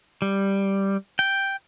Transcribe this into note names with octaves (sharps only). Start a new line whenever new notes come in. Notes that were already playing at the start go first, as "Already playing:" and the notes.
G3
G5